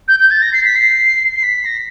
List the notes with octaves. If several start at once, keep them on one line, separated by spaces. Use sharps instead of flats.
G6
G6
A6
A#6
C7
B6
C7
C7
B6
A#6